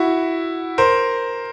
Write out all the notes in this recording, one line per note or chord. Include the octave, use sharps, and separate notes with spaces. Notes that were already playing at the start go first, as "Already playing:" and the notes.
Already playing: E4 F#4
A#4 C5